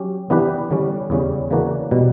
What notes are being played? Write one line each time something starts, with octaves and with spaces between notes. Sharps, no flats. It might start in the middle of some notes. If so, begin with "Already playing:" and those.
Already playing: F#3 C#4 G4
E3 B3 D4 G4 B4
D3 G3 C#4
E2 C#3 G3 C#4
C#3 E3 A#3 D4 F#4
B2 G3